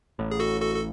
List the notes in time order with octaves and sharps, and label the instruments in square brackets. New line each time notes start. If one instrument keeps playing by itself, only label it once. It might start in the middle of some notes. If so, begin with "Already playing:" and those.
[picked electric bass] A1 A2
[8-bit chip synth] G#4
F#4 A4
F#4 A4
A4